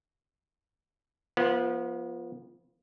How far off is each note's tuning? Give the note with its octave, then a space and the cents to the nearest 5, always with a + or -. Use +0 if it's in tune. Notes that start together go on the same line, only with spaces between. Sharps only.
F3 -5 B3 -35